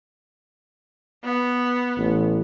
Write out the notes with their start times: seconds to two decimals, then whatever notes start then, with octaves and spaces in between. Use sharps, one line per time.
1.24 B3
1.97 A1